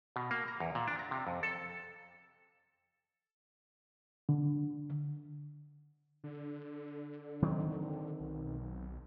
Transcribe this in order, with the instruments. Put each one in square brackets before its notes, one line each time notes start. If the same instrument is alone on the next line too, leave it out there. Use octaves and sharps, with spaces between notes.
[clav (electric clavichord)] B2
A#3
A#5
E2
A#2
D4
A#5
C3
F2
A4
[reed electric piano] D3
[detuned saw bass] D3
[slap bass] D#3 F#3 C4
[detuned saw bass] B1
B1